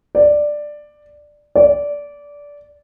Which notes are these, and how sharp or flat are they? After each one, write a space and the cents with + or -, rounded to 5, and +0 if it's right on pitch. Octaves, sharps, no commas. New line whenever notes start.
D5 +10
D5 -15